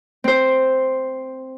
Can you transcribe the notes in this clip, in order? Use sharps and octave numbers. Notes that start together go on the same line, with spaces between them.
C4 C5